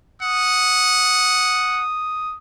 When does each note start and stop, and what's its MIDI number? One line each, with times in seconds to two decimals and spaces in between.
0.22 1.83 78
0.22 2.37 87